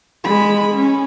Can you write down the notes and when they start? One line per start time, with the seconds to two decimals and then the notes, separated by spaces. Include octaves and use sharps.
0.25 G#3 B5
0.74 C#4